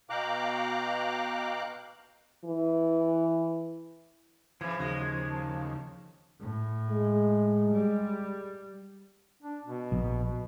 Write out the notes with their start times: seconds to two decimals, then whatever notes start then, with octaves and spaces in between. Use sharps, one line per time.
0.10 B2 F5 G5 A#5 D6 F#6
2.45 E3
4.61 C#3 E3 F3 G#6
4.79 D#2 C#3 G#3 F#4
5.30 A5
6.41 A2
6.91 G#3
7.73 G3
9.42 D4
9.65 B2
9.92 A#1
10.24 B2